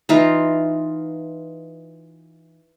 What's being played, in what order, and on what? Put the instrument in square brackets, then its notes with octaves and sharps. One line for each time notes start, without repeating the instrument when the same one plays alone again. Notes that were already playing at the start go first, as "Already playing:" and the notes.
[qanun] E3 D#4 F4